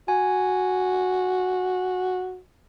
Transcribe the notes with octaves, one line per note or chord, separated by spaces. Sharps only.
F#4 G#5